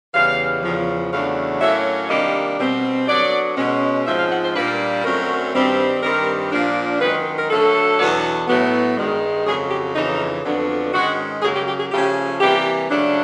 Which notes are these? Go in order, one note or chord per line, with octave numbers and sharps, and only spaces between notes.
E2 C#3 E3 G3 F5
E2 C#3 F3
E2 C#3 F#3 A3 D4 F5
A2 F#3 A#3 C#4 E5
C3 D#3 G3 A#3 D4 D#5
B2 G3 C4
D3 F#3 B3 D5
B2 G#3 C#4
G#2 F3 G#3 C4 E5
F5
F#5
C5
A#2 G3 A#3 D4 B4
A#4
F#2 D3 F#3 A3 C4 A#4
G2 D#3 G3 C4
G2 D#3 G3 C4 A#4
A#2 F3 A#3 D4
F#2 D#3 G#3 B4
A#4
D3 F#3 A3 A4
E2 B2 F#3 B3 D4
A2 F#3 B3
G2 D#3 G#3
F2 C#3 F#3 G#4
G4
F2 C#3 E3 D#4
F2 D3 F#3 B3 D4
G#2 D#3 G#3 C#4 F#4
F#2 C#3 F#3 A#3 G#4
G4
G4
G#4
C#3 F3 A3 C#4 G4
C3 E3 G3 A#3 G4
C#3 F#3 A3 D4